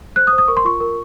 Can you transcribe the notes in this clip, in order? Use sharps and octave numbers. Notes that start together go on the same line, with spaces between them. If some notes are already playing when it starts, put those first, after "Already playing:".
C5 F#6
D#6
C5
D#6
A#4 C#6
C6
F4 C#6
A#4